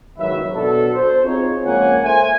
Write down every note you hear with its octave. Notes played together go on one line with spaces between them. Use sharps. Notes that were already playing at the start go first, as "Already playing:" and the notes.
F#1 G#2 D#3 F#3 B4 E5
B2 D4 F#4 A4
C5
C4 D#4 F4 G#4 C#5
C#2 F3 A#3 C#5 F#5 G#5
A4 C5 E5 G#5